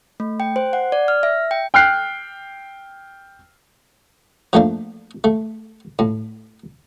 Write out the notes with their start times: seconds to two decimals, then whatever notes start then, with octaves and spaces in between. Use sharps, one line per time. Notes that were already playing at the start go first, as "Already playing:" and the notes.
0.20 A3
0.40 G5
0.56 C5
0.73 F#5
0.92 D5
1.08 F6
1.23 E5
1.51 G5
1.74 G5 F6 F#6 C7
4.53 F3 A3 A#3 D4
5.24 A3
5.99 A2